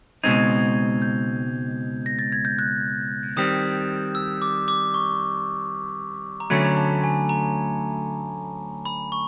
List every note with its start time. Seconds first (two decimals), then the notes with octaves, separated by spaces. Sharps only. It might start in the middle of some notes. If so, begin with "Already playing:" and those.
0.24 C#2 B2 G#3 C4 D#4 G#6
1.02 G6
2.06 A#6
2.19 A6
2.32 G#6
2.45 G6
2.59 F#6
3.37 D#3 G3 C4 D#6
4.15 E6
4.42 D6
4.68 D6
4.94 C#6
6.40 A#5
6.50 D2 D3 F#3 A3 C#4 B5
6.65 A#5
6.77 A5
7.03 G#5
7.29 A#5
8.85 B5
9.12 C#6